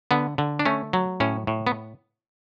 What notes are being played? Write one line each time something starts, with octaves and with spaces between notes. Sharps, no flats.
D3 B3
D3
D4
A3 C#4
F#3
A2 C#4
A2
B3